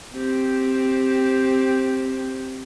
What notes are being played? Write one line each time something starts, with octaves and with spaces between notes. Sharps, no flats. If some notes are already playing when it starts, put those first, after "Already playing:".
C4 G4